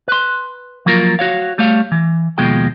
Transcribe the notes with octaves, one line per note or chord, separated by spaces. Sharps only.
B4 C6
F3 F#3 A#3 F4 A#4
F#4 C#5 F5
G3 A3 C#5 F5
E3
D#2 B2 F3 G#3 G5